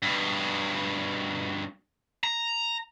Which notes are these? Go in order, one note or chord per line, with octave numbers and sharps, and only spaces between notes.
G2 B2
A#5